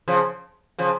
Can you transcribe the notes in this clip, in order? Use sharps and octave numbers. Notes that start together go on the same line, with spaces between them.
C#3 F3
C#3 F3